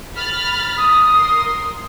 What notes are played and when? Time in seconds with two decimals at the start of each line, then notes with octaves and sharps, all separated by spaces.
0.15 B5 F6 A6
0.77 D#6
1.15 A#4 C6